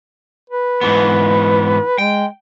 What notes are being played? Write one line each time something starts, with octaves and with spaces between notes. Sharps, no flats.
B4
G#2 E3 B3
G#3 G5